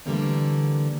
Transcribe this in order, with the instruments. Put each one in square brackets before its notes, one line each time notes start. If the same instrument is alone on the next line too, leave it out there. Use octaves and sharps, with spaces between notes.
[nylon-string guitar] D3 E3 G3 A3 A#3 C4